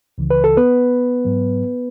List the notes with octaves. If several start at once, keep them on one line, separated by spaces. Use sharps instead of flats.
C#2 C#3 E3
B4
A4
B3 B4
G#2 F#3